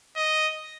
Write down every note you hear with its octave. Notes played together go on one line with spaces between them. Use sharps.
D#5